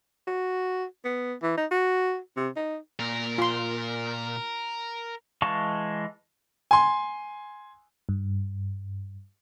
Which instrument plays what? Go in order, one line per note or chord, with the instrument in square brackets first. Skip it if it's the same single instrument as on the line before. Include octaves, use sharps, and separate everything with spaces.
[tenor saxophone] F#4
B3
E3
D#4
F#4
C3
D#4
[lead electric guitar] A#2 [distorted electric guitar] A#4
[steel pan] F4 C6
[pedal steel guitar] E3 G#3 F5 A5 C#6
[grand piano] G#5 C6
[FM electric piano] G2